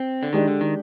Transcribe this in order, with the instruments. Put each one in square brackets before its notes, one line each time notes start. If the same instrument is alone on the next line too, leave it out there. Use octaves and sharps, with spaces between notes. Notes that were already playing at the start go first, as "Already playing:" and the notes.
Already playing: [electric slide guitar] C4
D3
[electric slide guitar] D#3 [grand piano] G#3 D4 G4
[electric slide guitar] D3
D#3